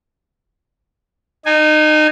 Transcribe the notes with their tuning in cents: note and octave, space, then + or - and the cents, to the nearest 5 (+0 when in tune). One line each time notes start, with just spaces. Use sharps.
D#4 -25 G#5 +0